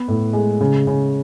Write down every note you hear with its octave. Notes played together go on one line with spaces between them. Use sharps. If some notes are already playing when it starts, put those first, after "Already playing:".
Already playing: B3
A2
G#3
C#3
C#3